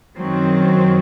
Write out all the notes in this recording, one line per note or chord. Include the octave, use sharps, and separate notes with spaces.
F#2 D#3 F#3 C4